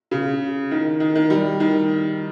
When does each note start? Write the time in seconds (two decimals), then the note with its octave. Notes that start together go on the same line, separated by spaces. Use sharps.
0.11 C#3
0.71 D#3
1.00 D#3
1.16 D#3
1.30 G3
1.60 D#3